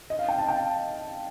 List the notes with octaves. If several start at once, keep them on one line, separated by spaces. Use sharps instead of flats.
D#5
F5
G5
A5
G5